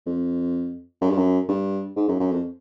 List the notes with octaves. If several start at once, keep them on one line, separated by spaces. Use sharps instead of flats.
F2
F#2
G2
F#2
G2
G#2
F#2
F#2
F2